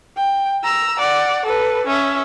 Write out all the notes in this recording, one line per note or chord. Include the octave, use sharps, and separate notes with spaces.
G5
A#5 E6
D5 F#5
A4 B4
C#4 E5